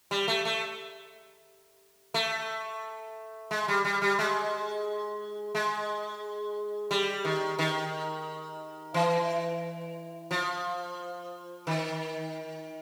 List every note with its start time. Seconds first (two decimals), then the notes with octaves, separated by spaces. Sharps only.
0.11 G3
0.28 A3
0.45 A3
2.14 A3
3.51 G#3
3.68 G3
3.85 G3
4.02 G3
4.19 G#3
5.55 G#3
6.91 G3
7.25 D#3
7.59 D#3
8.94 E3
10.31 F3
11.67 D#3